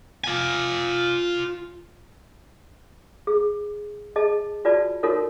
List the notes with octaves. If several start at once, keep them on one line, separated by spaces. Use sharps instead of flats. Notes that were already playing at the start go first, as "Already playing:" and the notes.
F4 G#5
G#4
G#4 D#5 A5
F4 F#4 B4 D5 A5
D#4 F4 F#4 A4 A#4 C#5